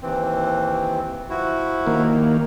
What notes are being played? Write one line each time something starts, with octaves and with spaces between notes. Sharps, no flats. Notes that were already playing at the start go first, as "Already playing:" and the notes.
D#2 E3 C4
F3 E4 F#4
D#3 A#3